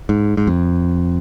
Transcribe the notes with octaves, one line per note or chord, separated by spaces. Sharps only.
G#2
G#2
F2